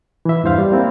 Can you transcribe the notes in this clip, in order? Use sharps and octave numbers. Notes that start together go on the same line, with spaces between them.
E3 E5
E2 G2 C5 F5
G3
A#3 C4 E4